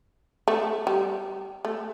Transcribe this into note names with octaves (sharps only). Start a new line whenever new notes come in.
A3
G3
A3